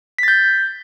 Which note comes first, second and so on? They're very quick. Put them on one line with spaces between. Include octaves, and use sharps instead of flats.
B6 A6 G6